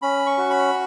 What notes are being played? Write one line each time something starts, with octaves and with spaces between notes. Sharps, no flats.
C#4 B5
C#6
F#4
B5